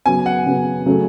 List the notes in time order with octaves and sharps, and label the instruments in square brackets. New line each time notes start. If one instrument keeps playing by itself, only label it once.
[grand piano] C#3 F#3 B3 [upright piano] G#5
[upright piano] F#5
[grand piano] C#3 F#3 B3
C#3 F#3 A3 C#4